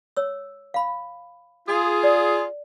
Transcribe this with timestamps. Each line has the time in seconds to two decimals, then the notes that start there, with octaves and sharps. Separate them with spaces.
0.17 C#5 E6
0.74 F5 B5
1.67 F4 G#4
2.03 D5